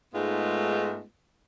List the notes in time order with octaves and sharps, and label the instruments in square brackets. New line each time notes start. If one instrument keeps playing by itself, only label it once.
[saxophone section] G#2 G#3 A3 B3 D#4 F4